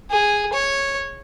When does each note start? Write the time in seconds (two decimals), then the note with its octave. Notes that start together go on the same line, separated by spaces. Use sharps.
0.11 G#4
0.53 C#5